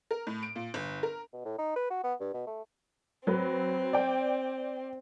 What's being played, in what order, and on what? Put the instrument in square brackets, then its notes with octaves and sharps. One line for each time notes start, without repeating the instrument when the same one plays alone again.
[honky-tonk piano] A#4
A2
D7
A#2
G1
A#4
[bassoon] B2
A2
D#4
B4
F#4
B3
G2
B2
A3
[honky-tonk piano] F#3 B4 [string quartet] C4
[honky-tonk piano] D5 G5